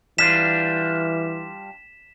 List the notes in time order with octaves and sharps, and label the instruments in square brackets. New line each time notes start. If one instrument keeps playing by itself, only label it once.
[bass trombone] E3 [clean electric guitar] G3 D4 F4 [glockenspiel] B6 E7